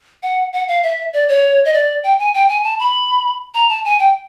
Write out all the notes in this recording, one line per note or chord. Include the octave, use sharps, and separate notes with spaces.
F#5
F#5
F5
E5
D5
C#5
D#5
D5
G5
G#5
G5
G#5
A5
B5
A#5
A5
G#5
G5